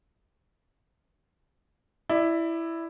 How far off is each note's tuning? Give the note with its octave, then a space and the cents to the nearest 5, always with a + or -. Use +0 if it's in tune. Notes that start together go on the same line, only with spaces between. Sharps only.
E4 +5 D5 +25